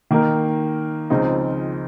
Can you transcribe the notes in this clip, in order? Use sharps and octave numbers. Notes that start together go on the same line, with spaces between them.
D#3 A#3 D#4 A#4
C#2 C#3 F3 C4 D#4